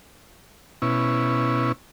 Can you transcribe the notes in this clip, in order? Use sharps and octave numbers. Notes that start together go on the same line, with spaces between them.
B2 C#4 E4